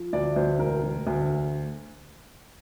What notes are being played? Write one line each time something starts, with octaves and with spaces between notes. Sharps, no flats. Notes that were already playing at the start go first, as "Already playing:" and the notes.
Already playing: F3
D2 D5
D2 C5
E1 A#4
E1
D2